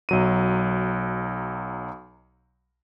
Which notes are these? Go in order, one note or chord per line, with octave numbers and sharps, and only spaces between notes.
B1 F#3 D#7